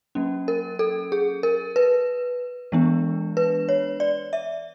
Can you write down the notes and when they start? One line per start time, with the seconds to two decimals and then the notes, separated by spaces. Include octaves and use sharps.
0.15 F#3 A#3 C#4
0.48 A#4
0.79 A4
1.12 G#4
1.43 A#4
1.76 B4
2.72 E3 G#3 B3 D4
3.37 B4
3.69 C#5
4.00 D5
4.33 E5